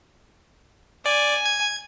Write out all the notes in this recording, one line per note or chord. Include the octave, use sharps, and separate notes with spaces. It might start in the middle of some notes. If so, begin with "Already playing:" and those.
D5 G#5
G#6